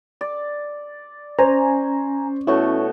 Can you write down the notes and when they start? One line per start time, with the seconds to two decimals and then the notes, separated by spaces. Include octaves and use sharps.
0.21 D5
1.39 C#4 C5 G#5 A#5
2.47 B2 A3 E4 F#4 C#5